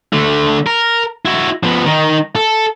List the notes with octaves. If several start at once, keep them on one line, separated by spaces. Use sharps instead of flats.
D3 A3
A#4
E4 F#4
F3 B3
D#3 D#4
A4